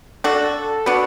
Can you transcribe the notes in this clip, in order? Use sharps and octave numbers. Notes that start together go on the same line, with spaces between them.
D4 F#4 A4
B3 D4 F#4